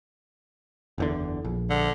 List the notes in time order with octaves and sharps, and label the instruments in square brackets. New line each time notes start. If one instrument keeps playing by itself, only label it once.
[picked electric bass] F#1 E2 D3
A#1
[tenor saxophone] D3